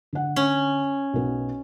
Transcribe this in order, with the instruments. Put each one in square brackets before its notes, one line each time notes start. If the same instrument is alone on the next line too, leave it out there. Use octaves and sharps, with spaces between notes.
[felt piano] D3 F#5
[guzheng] C#4
[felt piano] B1 B3